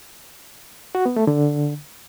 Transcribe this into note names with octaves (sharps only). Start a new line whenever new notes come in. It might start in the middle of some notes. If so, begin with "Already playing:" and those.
F#4
B3
A3
D3